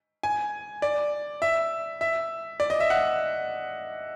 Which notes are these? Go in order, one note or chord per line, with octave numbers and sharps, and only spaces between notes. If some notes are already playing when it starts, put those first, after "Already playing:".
G#5
D5
E5
E5
D5
D#5
E5
F#5